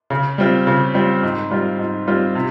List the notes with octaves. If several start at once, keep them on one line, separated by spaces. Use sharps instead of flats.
C#3
G3 C4 F4
C#3
G3 C4 F4
G#2
G3 C4 F4
G#2
G3 C4 F4
C3